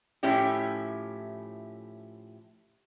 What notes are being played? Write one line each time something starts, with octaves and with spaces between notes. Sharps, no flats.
A2 F3 C#4 E4 G4